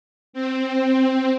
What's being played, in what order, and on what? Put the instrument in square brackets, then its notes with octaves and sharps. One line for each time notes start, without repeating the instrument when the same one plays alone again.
[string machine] C4